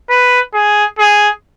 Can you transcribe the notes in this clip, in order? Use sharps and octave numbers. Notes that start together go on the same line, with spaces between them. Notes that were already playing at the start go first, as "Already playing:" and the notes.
B4
G#4
G#4